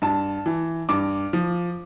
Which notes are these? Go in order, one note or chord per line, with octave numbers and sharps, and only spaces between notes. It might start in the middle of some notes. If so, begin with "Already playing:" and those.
G2 A5
E3
G2 D6
F3